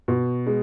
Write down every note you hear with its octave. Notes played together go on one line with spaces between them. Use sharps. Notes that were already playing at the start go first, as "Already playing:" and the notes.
B2
G#3